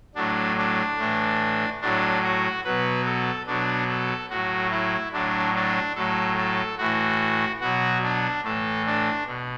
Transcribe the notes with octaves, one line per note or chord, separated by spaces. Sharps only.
A2 F#3 D4
D4
A2 E3
A2 F#3 D4
F#4
B2 F#3 B4
A4
B2 F#3 D4
A4
A2 F#3 F#4
E4
A2 F#3 D4
D4
A2 F#3 A4
A4
A2 E3 F#4
B2 F#3 F#4
D4
A2 E3 A4
D4
B2